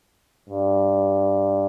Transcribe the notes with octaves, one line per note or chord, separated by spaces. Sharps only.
G2